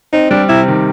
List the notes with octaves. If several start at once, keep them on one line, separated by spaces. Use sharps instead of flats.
C4 D#4
G3 D4
C3 E4
D#3